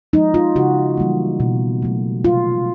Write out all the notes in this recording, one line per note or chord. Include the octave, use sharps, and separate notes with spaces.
F3 G#3 D#4
F4
C#3 F#4
E3 G3 A#3
B2
F#3 A3
C3 F4